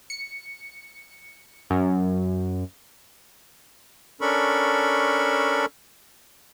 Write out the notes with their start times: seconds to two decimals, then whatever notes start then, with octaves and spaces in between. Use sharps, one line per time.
0.10 C#7
1.70 F#2
4.21 C#4 D4 A4 A#4 B5 C#6